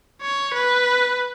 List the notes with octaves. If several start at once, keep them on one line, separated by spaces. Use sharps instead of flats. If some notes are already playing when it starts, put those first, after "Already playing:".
C#5
B4